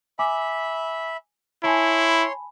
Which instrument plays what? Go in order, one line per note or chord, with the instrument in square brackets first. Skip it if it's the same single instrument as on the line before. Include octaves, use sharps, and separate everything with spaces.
[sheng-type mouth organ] E5 B5 [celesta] G#5 D6
[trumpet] E4 [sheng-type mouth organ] C#5 C6 [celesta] G#5 A5 B5